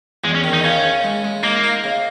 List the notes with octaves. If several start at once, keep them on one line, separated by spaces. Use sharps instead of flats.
E2 G#3
C#4
D#3
D#4
C#3 C#4
C#3
G#3
G#3
A#3 D#4
D#4
C#3